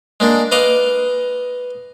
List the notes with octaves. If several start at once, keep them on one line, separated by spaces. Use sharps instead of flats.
G#3 A#3 D4
B4 D#5 F5 D6